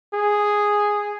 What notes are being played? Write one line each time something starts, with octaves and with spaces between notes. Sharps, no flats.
G#4